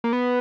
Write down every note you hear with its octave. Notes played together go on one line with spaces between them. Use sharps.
A#3
B3